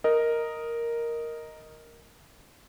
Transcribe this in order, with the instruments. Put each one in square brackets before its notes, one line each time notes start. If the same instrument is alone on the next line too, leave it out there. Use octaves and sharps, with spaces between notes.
[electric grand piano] A#4 D#5